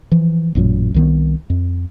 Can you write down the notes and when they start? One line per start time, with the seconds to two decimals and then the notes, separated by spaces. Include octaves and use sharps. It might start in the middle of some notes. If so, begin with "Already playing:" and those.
0.12 E3 F3
0.55 A1 F#2 A#2 F#3
0.94 C2 D#3 B3
1.50 F2